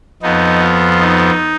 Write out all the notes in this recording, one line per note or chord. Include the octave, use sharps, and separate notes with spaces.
F2 F3 B3 D#4
F4
D#4